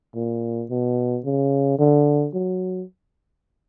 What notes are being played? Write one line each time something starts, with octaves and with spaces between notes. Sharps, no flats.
A#2
B2
C#3
D3
F#3